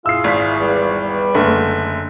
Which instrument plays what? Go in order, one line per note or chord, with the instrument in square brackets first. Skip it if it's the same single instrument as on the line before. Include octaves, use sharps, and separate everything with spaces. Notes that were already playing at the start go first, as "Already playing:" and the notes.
[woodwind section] E4 F4 G#4 [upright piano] E6 C7
[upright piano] G#1 B6
[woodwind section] E2 G3
[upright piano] F#1 D3 A3